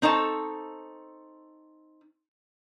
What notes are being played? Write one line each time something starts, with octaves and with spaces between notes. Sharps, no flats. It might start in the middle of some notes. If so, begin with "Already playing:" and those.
C4 D#4 A4 C#5 A5